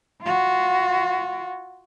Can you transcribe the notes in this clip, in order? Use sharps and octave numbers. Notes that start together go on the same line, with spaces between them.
F4 F#4